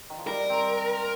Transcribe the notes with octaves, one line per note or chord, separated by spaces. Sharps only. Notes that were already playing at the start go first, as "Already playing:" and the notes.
D#3
F3
G3 A#4
C4